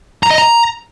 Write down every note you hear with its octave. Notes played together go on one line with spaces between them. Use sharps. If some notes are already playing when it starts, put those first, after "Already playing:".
A#5
D#5
A#5